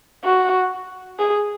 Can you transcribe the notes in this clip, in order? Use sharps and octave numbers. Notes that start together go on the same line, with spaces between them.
F#4
G#4